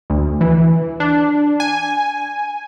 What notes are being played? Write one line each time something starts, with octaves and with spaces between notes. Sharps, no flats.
D2
E3
D4
G#5